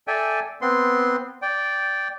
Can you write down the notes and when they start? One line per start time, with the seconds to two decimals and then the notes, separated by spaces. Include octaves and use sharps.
0.08 A4 D5 E5 G5 G#5
0.62 B3 C4 C6
1.42 D5 G5